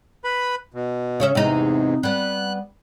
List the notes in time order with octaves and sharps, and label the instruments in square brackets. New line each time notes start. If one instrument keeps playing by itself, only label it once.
[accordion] B4 B5
B2
[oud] C#3 C#4 E5
[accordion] E2 G#2 [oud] C3 D#4
[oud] G3 B3 [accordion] F#6